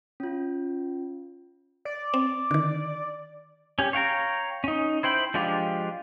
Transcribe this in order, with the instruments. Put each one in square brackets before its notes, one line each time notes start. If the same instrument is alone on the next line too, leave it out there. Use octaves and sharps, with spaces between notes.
[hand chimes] C#4 F4
[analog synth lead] D5
[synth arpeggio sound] C4
D3 D#3
[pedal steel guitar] C#4 G4
C#5 F5 G5 A#5
C#4 D#4
E4 C5 G5 B5
F3 G#3 D4 F4 G4